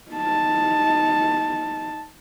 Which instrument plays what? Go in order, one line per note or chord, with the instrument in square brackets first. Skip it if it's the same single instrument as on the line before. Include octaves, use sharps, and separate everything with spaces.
[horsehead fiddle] D#4 A5